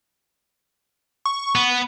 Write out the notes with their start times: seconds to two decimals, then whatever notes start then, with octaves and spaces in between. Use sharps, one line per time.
1.25 C#6
1.55 B3